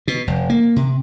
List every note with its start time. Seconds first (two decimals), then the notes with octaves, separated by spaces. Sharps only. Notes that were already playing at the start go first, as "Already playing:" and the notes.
0.08 B2
0.27 F1
0.50 A#3
0.76 C3